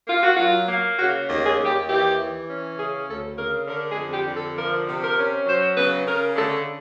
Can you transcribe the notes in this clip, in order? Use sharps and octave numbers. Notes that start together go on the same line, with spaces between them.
A#3 F4
F#4
F#3 F4
A#3
C#3 F#4
D#2
G#4
D#2
G4
E3 G4
E3
C#4
C#3 G#4
D2 A4
C#3 A#4
D3 A#4
G#4
F2
G4
D3
A4
F3 A#4
C3
A#4
C#4
F#3 C5
C#3 B4
C#3 A#4
D3 A4